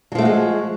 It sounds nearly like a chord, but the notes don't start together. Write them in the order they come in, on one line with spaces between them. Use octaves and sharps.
F#3 F3 A3 F#4 G#3